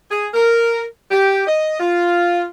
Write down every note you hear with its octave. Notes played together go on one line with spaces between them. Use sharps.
G#4
A#4
G4
D#5
F4